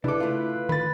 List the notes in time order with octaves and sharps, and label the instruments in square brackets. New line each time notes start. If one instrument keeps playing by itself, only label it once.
[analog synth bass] C#3 [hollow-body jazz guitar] D4 A4 [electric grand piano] E4 D6 [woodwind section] B4
[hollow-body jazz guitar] A3 F4
[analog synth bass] D#3 [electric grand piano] B5 A6